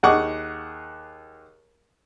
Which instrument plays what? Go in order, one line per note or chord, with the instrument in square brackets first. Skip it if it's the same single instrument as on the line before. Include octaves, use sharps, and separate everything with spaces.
[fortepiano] D#2 G#4 F#5 C#6 D6 F#6